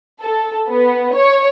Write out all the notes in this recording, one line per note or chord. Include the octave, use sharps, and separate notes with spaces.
A4
B3
C#5